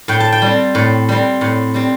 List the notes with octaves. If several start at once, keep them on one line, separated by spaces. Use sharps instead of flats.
A2 G5
A5
G5
G3 C4
A2
G3 C4
A2
G3 C4